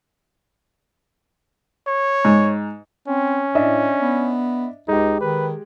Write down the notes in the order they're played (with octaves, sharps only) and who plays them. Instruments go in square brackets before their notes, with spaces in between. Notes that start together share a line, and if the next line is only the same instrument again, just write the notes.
[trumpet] C#5
[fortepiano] G#2
[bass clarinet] C4 [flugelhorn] C#4
[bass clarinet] A2 [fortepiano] D4 D#5 E5
[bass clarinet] B3
[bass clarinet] C#2 [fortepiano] G#3 G4 [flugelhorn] D#4
[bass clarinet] D#3 [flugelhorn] B4